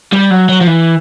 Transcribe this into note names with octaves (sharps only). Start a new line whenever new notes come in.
G3
F#3
F#3
F3
E3